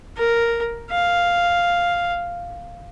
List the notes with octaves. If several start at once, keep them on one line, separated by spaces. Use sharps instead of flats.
A#4
F5